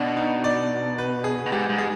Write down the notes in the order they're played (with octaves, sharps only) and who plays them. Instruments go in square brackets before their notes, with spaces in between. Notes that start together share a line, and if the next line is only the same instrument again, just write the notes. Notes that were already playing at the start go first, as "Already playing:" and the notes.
Already playing: [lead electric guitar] B2 [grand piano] D4
[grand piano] D#4
D5
B4
G#4
[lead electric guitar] B2
[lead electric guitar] G#2 [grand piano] G4
[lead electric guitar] G#2
[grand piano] G#4